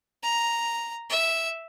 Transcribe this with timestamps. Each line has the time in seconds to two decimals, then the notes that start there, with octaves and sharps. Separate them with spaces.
0.23 A#5
1.10 E5